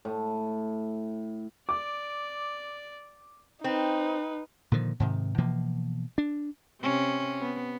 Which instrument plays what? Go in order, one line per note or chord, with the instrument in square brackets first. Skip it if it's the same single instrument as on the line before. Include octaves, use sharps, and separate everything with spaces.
[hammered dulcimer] A2
[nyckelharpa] D5 [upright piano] D6
[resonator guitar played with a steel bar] C4 [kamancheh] D#4 [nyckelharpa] B4
[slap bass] A#2 D3 D#3 F3
G#2 C3 D#3
B2 E3 F3 A#3
D4
[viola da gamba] C3 C#4
B3